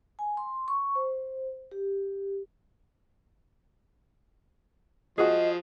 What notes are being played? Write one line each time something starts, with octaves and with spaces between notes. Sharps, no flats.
G#5
C6
C#6
C5
G4
F3 F#4 G#4 D#5